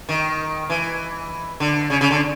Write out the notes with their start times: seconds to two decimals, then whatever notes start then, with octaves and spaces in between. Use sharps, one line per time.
0.09 D#3
0.70 E3
1.60 D3
1.90 C#3
2.01 C#3
2.11 D3